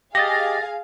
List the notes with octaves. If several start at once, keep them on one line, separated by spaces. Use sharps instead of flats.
G4 G#4 D#5 F5 A6 A#6